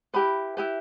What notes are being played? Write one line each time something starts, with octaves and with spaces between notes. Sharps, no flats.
E4 G4 B4 B5
E4 G4 B4